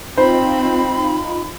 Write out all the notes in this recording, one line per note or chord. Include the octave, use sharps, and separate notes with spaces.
C4 D#4 F4 C5 B5